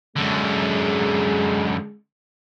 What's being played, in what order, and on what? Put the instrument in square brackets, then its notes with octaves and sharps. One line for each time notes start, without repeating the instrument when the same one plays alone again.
[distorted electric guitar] F#2 D3 [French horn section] G#3